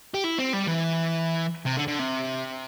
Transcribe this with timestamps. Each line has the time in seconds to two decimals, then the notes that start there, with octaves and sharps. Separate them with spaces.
0.14 G4
0.24 E4
0.39 C4
0.53 G3
0.68 E3
1.66 C3
1.77 D3
1.87 D3
1.99 C3